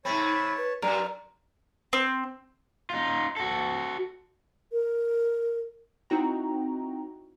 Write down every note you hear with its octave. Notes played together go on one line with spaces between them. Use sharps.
G#2 C3 C4 C#5 A5 B5
B4
F#2 A#4 D5
C4
D#4 F4
F#4 A4
A#4
C4 D#4 E4 F#4 G5 A#5